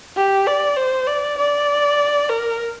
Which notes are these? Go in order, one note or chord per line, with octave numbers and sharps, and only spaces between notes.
G4
D5
C5
D5
D5
A#4